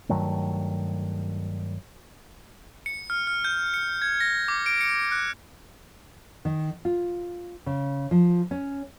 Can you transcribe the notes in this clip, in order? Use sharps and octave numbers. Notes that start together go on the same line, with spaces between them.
G2 D#3 F#3 A3
C#7
F6
F6
G6
C#7
G#6
A#6
D6
D7
C#7
F#6
D#3
F4
C#3
F3
C#4